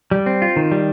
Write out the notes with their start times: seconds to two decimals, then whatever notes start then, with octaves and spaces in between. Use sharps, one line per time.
0.11 G3
0.26 C4
0.42 F4
0.56 D#3
0.72 G3